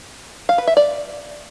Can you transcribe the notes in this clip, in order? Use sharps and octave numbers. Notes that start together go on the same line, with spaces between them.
F5
B4
E5
D5